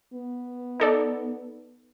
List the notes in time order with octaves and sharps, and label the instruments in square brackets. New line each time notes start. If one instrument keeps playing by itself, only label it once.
[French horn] B3
[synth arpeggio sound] D#4 A4 D5